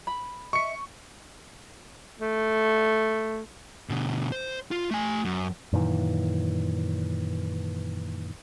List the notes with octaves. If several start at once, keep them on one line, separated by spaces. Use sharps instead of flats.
B5
D#5 E5 C#6 C#7
A3
B2 D3
C5
F4
A3 G#5
F#2
F#2 A#2 D#3 E3